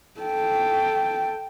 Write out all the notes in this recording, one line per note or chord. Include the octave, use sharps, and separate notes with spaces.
A4 G5